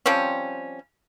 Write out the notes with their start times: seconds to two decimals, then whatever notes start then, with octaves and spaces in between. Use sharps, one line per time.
0.06 F3 G3 C4 C#4